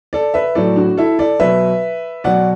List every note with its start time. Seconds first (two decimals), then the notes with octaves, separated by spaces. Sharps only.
0.13 A4 D5
0.34 B4 E5
0.55 A2 F#3 A4 D5
0.76 D4 F#4
0.97 E4 A4
1.19 A4 D5
1.40 B2 F#3 B4 E5
2.24 B2 F#3 D5 F#5